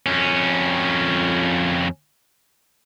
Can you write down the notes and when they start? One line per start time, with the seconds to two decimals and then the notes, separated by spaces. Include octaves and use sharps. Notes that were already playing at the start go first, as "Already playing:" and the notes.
0.06 F2 C#4